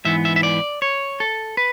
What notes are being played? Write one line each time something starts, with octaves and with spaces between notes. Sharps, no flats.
G#2 E3 B3 E5
E5
E5
D5
C#5
A4
B4